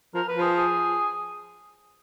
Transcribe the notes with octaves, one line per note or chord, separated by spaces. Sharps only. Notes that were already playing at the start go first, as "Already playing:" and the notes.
F3 A#4
B4
F3
G#4
G#4